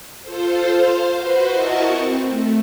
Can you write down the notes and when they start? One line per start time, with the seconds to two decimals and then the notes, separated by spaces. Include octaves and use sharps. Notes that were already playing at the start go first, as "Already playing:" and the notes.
0.22 F4 A4 C5
0.70 C5 F5
1.14 F#4 B4 C5
1.51 E4 F#4 A#4 D#5 A5 C#6
1.87 C4
2.22 A3